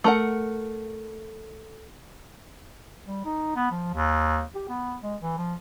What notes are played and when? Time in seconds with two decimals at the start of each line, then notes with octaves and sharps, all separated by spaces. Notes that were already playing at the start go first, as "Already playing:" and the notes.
0.04 A3 A#4 F#5
3.06 G3
3.25 D#4
3.56 B3
3.71 F3
3.94 D#2
4.55 G4
4.69 B3
5.02 G#3
5.21 E3
5.37 F3